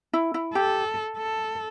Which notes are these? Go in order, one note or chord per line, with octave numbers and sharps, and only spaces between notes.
E4
E4
G4 A4
A4